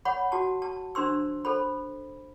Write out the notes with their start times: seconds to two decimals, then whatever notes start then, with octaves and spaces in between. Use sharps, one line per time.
0.05 C#5 F#5 B5
0.32 F#4 A5
0.62 A5
0.95 D4 C5 C6 E6
1.45 A4 C5 B5